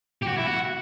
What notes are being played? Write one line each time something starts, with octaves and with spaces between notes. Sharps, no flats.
G4
F#4
E4
F#4